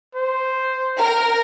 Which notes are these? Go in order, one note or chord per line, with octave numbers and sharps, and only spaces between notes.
C5
A#4